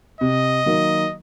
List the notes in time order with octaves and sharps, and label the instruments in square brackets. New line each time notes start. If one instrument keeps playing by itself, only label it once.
[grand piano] C3 [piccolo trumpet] D#5
[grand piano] D#3 F#3 A#3